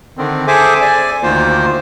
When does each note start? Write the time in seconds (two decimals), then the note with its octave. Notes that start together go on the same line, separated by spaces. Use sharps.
0.17 D3 D#3 C4
0.47 G#4 A4 C5 E5 G#5 D6
0.81 D5 G#5
1.23 D2 D#3 A#3 F4 C5